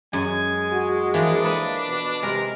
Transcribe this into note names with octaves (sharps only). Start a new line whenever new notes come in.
F#2 G#3 G#5
F#4
E3 F3 A#3 D4
A4 B4 D5 D#5
B2
C3 G#3 A#4